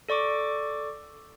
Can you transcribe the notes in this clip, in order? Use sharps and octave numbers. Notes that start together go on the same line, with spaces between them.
A4 D5 C#6 D6